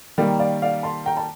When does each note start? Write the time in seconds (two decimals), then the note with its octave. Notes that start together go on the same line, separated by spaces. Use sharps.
0.18 D#3 G3 A#3
0.39 D5 F5
0.62 D5 F5
0.83 A5 C6
1.06 G5 A#5
1.17 A5